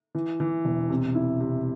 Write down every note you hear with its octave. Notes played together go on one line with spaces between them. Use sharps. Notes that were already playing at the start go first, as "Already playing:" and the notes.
E3
E3
E1
C3
E4
C3